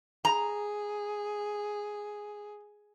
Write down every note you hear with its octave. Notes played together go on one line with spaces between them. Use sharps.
G#4 A#5